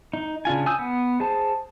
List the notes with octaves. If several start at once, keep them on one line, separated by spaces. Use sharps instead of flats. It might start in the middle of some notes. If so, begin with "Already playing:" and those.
D#4
C#3 D4 F4 G#5
G#5 D#6 E6 G6
B3
G#4 C5 A5